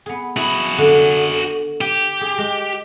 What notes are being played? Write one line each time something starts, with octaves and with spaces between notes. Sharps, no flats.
B3 G#4
E4 F#4 G#4
D3
G4 G5
G#4
G#3